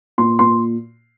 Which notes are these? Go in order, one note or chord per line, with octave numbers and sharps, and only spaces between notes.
A#2 C6
A#2 C6